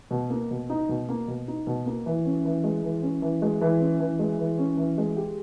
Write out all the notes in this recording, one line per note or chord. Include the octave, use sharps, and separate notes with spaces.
B2
A#3
B2
D#4
B2
A#3
B2
D#4
B2
A#3
E3
C#4
E3
G#3
E3
C#4
E3
G#3
E3
C#4
E3
G#3
E3
C#4
E3
G#3
G4